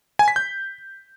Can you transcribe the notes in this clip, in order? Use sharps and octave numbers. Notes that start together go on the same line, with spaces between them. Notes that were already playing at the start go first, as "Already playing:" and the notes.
G#5
B6
G6